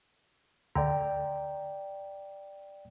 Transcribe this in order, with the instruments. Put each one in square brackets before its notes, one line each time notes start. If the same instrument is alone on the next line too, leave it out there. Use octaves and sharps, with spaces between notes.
[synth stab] D2 [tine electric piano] D5 G5 A#5